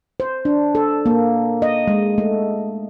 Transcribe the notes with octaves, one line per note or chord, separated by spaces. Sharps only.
C5
D4
A4
A#3
D#5
G#3
A3